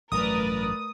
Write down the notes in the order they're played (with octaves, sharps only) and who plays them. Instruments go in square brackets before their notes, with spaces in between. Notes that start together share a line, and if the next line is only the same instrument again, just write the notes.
[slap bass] A1 G2 F#3 [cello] A3 [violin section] A#4 B4 D5 [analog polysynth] D#6